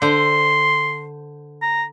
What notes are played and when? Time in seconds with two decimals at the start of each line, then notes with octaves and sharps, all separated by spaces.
0.02 D3 C5 C6
1.62 A#5